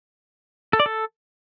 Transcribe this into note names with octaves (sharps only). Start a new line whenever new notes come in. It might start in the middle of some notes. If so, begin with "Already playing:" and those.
A4
D5
A4